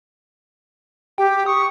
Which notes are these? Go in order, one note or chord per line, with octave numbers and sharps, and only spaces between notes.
G4 G5
C#6 D#6